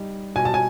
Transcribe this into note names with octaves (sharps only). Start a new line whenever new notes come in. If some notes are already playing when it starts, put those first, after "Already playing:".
Already playing: G3 D#4
B2 G#5
A5
G#5